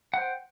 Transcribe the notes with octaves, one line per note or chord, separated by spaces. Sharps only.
C5 F#5 G5